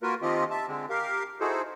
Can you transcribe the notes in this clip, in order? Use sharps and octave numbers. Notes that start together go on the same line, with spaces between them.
A#3 F4 F#4 A#4 B4
D#3 F3 C4 F4 G4 D#5
E5 A5
D3 G#3 C4
G4 A#4 F5
D#4 E4 F#4 G#4 A4 C5